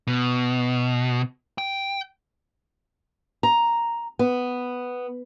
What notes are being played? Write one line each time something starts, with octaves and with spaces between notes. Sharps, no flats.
B2
G5
A#5
B3